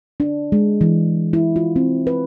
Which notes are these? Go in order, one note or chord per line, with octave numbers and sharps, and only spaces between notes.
D4
G#3
E3
E4
F4
C4
B4